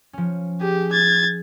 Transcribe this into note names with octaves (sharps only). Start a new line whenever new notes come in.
F3 C#4
G4 G#4
G#6 A6